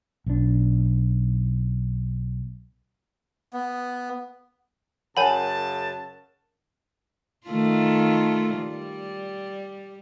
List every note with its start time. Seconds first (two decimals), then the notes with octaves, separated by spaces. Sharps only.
0.26 B1 D4
3.54 B3
5.17 F#2 C#3 A#4 C#5 F#5 G#5 A5 B5
7.47 D#3 A3 F4
8.58 G3